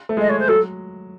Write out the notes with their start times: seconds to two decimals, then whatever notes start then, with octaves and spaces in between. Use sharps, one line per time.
0.09 A3
0.17 G#3 D#5
0.29 C#5
0.39 C5
0.48 F#3 A4